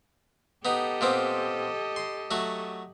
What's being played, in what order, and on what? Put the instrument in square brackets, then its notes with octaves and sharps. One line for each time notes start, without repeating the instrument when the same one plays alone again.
[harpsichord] B3 D#4 [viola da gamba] G4 A4 D#5
[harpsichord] A#2 B3 C4
C6
F#3 A3 F#4